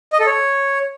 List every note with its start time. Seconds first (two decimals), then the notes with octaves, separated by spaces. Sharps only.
0.13 D#5
0.20 A4
0.27 C#5